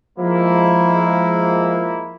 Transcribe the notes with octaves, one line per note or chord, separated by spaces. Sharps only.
F3 G#3 A#3 E4